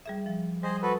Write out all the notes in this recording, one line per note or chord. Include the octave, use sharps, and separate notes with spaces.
G3 G#4 E5
F3
G3 G#4 C5 D#5
F#4 A4 B4